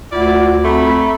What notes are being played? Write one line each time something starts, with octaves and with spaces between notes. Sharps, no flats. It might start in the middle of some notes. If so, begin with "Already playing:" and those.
D2 E4 F4 D5 F#5
A3 C4 A#5 B5